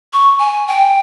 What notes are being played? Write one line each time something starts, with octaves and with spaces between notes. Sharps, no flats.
C#6
G#5
G5